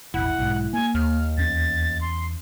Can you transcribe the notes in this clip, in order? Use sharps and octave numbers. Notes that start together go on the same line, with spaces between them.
E1 A1 E4 F#5
B1 G#2
A#3 G#5
D#2 F6
E2 C#4 A6
C6